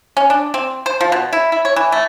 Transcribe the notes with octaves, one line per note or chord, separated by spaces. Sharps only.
C#4
D4
C4
C5
F3
B2
E4
E4
C#5
E3
A3